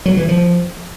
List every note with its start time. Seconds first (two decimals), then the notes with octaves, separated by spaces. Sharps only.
0.06 F#3
0.17 E3
0.29 F3